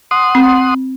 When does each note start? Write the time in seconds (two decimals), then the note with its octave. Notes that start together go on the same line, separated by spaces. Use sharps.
0.11 F#5 C6 D#6
0.35 C4